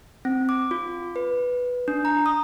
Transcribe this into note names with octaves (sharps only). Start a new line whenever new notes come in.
C4
D6
F4
B4
D4
A#5
D#6